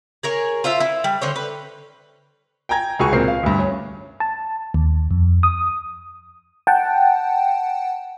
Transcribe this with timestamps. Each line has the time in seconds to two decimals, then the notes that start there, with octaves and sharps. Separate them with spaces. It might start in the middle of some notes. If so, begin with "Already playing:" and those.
0.23 G#4 A#4 C#5
0.64 F4 C5 E5 F5
0.80 E4
1.04 G3
1.21 D3 C5 C#5
1.36 B4
2.69 G5 G#5 A#5 G#6
2.99 C#2 F#4 G#4 G#5 C#6
3.13 C#2 A#2 C4 A#4 C7
3.28 F5
3.43 D2 G2
3.59 C#4
4.20 A5
4.74 D#2
5.11 F2
5.43 D#6
6.67 F#5 G5 A5